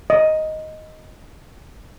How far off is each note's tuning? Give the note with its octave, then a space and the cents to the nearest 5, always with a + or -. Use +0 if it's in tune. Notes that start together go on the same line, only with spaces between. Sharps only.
D#5 +5